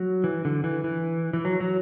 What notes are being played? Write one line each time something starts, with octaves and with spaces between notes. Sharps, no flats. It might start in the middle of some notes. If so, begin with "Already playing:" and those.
Already playing: F#3
E3
D3
E3
E3
E3
F#3
F#3